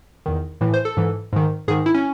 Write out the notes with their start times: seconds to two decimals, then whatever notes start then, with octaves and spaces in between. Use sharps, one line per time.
0.26 E2 D#3
0.61 A2 E3
0.74 C5
0.85 A4
0.97 G#2 E3
1.33 G#2 D#3
1.68 G#2 D#3 G#4
1.86 E4
1.94 C#4